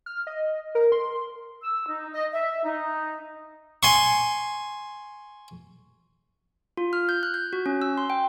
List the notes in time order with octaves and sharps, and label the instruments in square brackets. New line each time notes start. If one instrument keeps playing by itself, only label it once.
[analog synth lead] F6
D#5
A#4
C6
[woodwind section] E6
D#4
D#5
E5
D#4
[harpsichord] G#5 C6 C#6
[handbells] F4
F6
G6
F#6
G6
F#4
C#4
E6
C6
G5